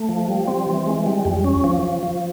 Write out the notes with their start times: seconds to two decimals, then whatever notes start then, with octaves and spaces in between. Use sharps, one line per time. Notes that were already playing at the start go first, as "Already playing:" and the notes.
Already playing: A3
0.09 F3
0.28 G3
0.48 C4
0.67 E3
0.86 G#3
1.06 G3
1.25 F2
1.44 C#4
1.64 F3
1.83 F3
2.03 F3